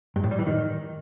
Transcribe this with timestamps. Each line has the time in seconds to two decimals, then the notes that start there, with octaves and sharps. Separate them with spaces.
0.16 G2
0.24 A2
0.31 G3
0.39 E3
0.46 D#3